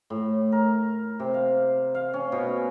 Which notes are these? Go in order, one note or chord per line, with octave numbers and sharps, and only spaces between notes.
A2
A#4
C3
F5
F5
C#4
B2